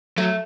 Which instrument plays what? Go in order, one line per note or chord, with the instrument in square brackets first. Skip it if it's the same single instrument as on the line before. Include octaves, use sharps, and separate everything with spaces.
[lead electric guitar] F#3 [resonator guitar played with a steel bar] A3